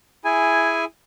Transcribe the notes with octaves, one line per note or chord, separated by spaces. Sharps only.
E4 G#4 G#5